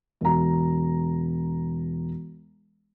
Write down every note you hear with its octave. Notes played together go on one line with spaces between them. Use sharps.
E1 A#5